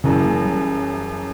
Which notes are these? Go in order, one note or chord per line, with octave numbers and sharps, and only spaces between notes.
F#1 F#2 C#3 E3
A#3
G3